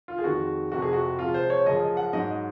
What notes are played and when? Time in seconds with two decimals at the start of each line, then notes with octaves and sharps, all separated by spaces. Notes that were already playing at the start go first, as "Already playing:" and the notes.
0.08 F4
0.18 G#4
0.24 F2 D#3 G#3 F#4
0.71 F2 C3 F3 F#4
0.82 G#4
0.93 F#4
1.19 C3 F3 G#3 F4
1.34 C5
1.50 C#5
1.66 F#2 C#3 F3 G#3 D#5
1.97 F#5
2.13 G#2 F#3 D#5